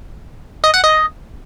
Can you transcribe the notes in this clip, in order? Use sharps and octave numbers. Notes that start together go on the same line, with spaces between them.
D#5
F#5
D#5